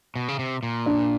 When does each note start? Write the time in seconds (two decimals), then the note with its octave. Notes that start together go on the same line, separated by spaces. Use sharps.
0.16 B2
0.28 C#3
0.39 C3
0.63 A#2
0.86 D4